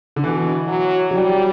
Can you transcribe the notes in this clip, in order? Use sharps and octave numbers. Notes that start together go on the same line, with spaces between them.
D3
B2 E3
F#3
F#3 G3